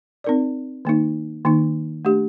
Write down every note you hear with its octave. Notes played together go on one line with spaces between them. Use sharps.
C4 D#4 A#4 D5
D#3 A#3 D#4
D#3 A#3 D#4
A3 D4 G4